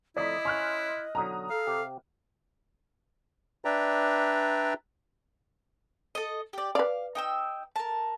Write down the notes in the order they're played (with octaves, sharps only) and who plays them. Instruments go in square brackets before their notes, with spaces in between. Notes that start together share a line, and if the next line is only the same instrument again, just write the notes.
[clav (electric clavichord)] F2 A2 A#5 [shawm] E4 [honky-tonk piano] D5 D#6 B6 [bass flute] D#5
[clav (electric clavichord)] C#4 [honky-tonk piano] C6 F6 F#6
[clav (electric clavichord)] B1 D3 F#3 [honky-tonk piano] A#5 D#6
[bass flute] A4 [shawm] F5
[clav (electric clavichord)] C3 G4
[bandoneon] D4 B4 D5 E5 G5 A#5
[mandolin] A4 D#5
G4 D5
[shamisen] B4 D5 [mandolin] F5
[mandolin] D#4 G5 E6
A#4 A5